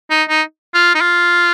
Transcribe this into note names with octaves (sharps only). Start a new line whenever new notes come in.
D#4
D#4
F4
D#4
F4